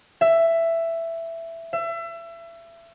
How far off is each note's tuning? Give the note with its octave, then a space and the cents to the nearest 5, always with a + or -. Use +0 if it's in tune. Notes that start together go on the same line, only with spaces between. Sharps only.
E5 +10
E5 +30